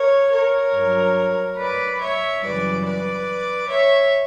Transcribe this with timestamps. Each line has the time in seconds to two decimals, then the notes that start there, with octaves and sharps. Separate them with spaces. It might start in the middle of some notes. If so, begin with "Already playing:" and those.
Already playing: A#4 C#5
0.33 A#4 C#5
0.74 G2 F#3
1.58 B4 D5
2.01 C#5 E5
2.43 F#2 C#3 E3 G3 B4 D5
2.85 B4 D5
3.70 C#5 E5